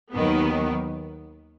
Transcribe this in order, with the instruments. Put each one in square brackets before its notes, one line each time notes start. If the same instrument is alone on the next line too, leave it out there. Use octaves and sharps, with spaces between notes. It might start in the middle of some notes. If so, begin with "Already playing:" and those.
[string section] D#2 D#3 F#3 B3